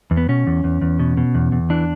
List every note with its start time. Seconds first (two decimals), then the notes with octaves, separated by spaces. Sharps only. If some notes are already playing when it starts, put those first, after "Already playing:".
0.11 E2
0.17 B3
0.29 B2 C#4
0.47 E2
0.64 E2
0.81 E2
0.99 B2
1.17 B2
1.35 E2
1.52 E2
1.70 E3 D4